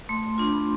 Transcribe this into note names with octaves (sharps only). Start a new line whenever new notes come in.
A3 C6
D4 F4 C6
B5